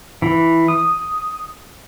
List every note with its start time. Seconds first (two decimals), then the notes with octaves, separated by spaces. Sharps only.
0.22 E3
0.68 D#6